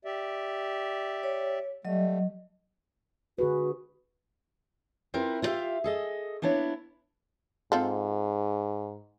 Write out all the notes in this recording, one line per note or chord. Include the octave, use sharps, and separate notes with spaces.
G4 D5 E5
C#5
F#3 G3 A3 D#5
D3 F#4 G#4 B4
C4 E4 F4 A#4 B4
E4 F4 G4 C5 E5 F5
G#4 A4 D#5
A#3 B3 D4 E4 C#5
G#2 C4 F4 A4